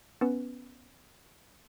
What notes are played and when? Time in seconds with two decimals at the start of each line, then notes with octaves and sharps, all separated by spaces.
0.21 B3 C#4 B4